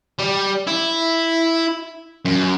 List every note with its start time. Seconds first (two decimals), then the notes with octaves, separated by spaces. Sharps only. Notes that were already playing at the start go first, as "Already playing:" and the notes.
0.19 G3
0.67 E4
2.25 F#2